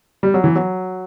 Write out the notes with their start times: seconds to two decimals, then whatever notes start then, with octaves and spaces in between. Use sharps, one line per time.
0.23 G3
0.34 F#3
0.44 E3
0.56 F#3